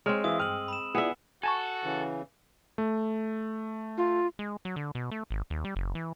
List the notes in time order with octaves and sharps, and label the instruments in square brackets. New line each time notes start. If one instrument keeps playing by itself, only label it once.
[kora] G#3 C4 [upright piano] C#5 F6
[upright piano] E3 [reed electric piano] E5 F5 [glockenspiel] D#6 E6
[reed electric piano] G2 G5 [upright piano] F6 [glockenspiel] D#7 F#7
[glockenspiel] B5 E7
[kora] B3 E5 [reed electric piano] E4 F4 D5 [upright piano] G#4
[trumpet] F#4 [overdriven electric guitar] A4 [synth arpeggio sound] G#5 A5 C#6
[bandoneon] C#3 E3
[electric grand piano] A3
[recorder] F4
[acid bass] G#3
F#3
D3
B2
A3
G#1
D#2
G3
F#1
E3